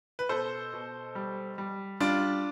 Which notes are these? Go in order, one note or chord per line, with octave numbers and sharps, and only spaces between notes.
B4
B2 A4 C5
B2
G3
G3
G3 D4 F4